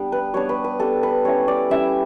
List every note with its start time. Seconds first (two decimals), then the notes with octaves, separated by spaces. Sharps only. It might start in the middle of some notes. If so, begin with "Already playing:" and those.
Already playing: G3 B3 D4
0.12 B4
0.34 G3 B3 D4 C#5
0.49 B4
0.64 B4
0.79 G3 B3 D4 A4
1.03 B4
1.24 G3 C#4 E4 C#5
1.48 D5
1.70 G3 C#4 E4 E5